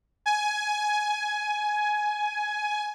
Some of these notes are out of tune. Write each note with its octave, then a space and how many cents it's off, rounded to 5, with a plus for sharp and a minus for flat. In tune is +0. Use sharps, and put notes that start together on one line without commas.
G#5 +15